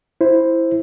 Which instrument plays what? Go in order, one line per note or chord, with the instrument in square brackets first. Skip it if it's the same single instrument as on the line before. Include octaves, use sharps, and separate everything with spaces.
[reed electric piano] E4 C5